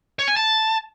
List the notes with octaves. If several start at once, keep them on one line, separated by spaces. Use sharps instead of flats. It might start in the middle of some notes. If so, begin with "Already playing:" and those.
C#5
G#5
A5